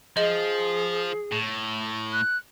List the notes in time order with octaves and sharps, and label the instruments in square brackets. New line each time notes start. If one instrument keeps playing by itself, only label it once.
[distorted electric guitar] F3 [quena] G#4 [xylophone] D#5
[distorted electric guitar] A2
[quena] F#6